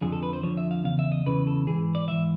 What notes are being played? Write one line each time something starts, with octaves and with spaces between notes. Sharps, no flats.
F2 D3 F3 G#4
A4
B4
C5
F2 D3 F3 C#5
E5
F5
E2 C#3 F5
E5
D#5
E2 C#3 E3 B4
A4
G#2 E3 G#4
D5
G#2 E3 E5